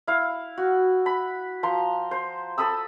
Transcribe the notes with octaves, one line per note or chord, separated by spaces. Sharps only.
E4 F5
F#4
B5
F3 A#5 C6
C5
A4 B5 D#6 E6